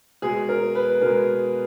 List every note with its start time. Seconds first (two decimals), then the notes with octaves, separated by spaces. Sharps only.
0.22 B2 G#3 G#4
0.49 A#4
0.75 B4
1.01 B2 G#3 A#4